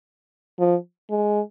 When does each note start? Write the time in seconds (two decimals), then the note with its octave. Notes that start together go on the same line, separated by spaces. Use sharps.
0.60 F3
1.10 G#3